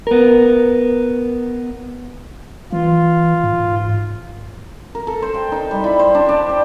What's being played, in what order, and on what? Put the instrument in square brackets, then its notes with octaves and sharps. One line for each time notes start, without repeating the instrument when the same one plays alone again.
[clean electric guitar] B3 A#4
[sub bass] E3 [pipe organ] F4
[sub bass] G#2
[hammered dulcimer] A#4
A4
C5
G5
D#4
G3
E4
C5
D4
D4
G5